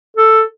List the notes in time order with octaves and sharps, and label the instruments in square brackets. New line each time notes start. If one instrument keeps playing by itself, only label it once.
[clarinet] A4